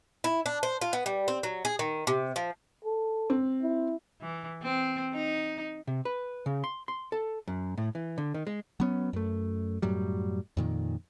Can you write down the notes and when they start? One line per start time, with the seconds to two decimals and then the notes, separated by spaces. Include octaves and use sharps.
0.24 E4
0.46 D4
0.63 C5
0.81 F4
0.93 B3
1.06 G3
1.28 C4
1.43 F#3
1.65 G#4
1.79 D#3
2.07 C3
2.36 F3
2.85 A4
3.30 C4
3.63 E4
4.21 E3
4.63 C4
5.13 D#4
5.87 C3
6.05 B4
6.46 C#3
6.64 C6
6.88 C6
7.12 A4
7.47 F#2
7.78 A2
7.95 E3
8.18 D3
8.34 D#3
8.47 G#3
8.80 F#3 B3 C#4
9.13 F#2 A3
9.82 F#2 A2 F#3 G3
10.57 F2 A#2 D#3